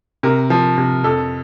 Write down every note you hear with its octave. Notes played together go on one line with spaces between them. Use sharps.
C3 A#4
F3
C3
F2 A4